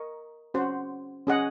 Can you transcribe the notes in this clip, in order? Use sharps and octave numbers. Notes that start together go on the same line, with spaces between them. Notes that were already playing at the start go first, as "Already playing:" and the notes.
Already playing: A#4 D#5 C#6
C#4 F#4 C5 F#5
C#4 G#4 D#5 F#5